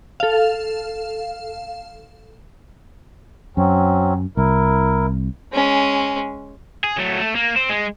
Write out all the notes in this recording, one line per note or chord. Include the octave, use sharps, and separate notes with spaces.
A4 F5
F#2 F#3 C4 C#4
C2 E4 A#4
G#3 C#4
G#4
F#3 A3
A3
A#3
C4
G#3